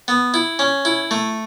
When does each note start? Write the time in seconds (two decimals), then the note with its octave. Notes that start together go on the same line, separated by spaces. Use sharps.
0.08 B3
0.34 E4
0.59 C#4
0.85 E4
1.11 A3